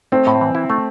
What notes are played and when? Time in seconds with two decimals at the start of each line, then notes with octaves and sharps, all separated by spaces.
0.12 A3 C4
0.27 A2
0.41 E3
0.55 E4
0.70 A3